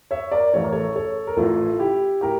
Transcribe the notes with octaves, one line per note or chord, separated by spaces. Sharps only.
C#5 E5
A#4 D5
A1 A2 E3 C#5
A#4
A4 C#5
A4 C#5
A#4
A1 A2 E3 F4 A4
E4 G4
A2 G4 A#4